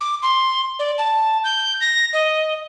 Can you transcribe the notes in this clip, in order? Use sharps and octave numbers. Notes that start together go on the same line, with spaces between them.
D6
C6
D5
A5
G6
A#6
D#5